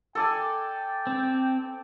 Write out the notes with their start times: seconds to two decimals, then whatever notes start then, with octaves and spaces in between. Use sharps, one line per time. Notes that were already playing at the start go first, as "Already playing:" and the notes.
0.15 A4 D5 G5 G#5
1.07 C4